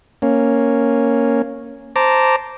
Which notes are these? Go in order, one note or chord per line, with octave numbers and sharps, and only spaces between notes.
A#3 C#4
C5 A5 A#5 D6